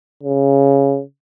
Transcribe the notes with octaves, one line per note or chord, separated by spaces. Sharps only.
C#3